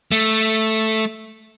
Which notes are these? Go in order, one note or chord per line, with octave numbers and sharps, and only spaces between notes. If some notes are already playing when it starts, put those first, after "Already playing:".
A3